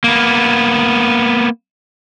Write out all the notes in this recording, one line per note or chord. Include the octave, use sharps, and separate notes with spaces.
A#3 B3